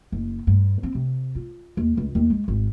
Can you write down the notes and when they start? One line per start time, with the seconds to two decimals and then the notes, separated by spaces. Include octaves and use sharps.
0.12 F#1
0.47 G2
0.83 C4
0.95 C3
1.35 F4
1.77 D#2
1.97 C#2
2.15 D#2
2.30 G#3
2.48 G#1